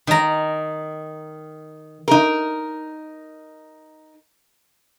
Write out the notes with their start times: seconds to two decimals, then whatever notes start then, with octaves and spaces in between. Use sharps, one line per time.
0.07 D#3 A#5
2.08 D#4 A#4